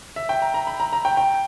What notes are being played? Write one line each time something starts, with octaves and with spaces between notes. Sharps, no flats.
E5
G5
A#5
A#5
B5
A#5
A#5
G5
G5